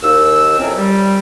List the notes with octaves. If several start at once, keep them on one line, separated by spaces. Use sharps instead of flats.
D#2 E6
F2 A2 C3 F#3 C4 C#4
G3